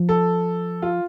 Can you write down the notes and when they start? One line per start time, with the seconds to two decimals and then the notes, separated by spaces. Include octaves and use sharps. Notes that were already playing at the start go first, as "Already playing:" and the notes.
Already playing: F3
0.09 A4
0.82 F4